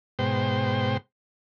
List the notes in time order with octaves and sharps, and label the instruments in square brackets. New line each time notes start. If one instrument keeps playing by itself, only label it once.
[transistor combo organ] G#2 B2 C5 G5